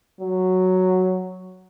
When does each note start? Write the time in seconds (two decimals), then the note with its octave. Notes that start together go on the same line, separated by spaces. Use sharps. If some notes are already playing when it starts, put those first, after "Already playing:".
0.21 F#3